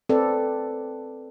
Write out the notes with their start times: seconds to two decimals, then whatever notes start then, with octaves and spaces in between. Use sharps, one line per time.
0.09 C4 A4 B4 D5